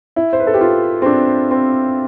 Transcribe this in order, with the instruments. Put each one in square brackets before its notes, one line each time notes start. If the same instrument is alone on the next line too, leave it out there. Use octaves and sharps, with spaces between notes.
[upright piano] E4
C5
B4
A4
G4
F4
C4
D4
C4